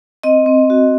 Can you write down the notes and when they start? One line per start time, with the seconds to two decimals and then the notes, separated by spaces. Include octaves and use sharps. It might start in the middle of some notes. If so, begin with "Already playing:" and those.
0.23 C4 D#5
0.46 C4
0.70 F#4